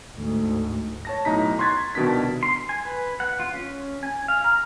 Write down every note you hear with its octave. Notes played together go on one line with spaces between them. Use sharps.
D2 G#2
C#5 A5 A#6
B1 A2 D#4 A#5 B6
C6 C#6 F#6 G#6 A6 B6
C2 B2 D#3 D4 B6
C6
G#5
B4
F#5
F4
C#4
G#5
F5
A#5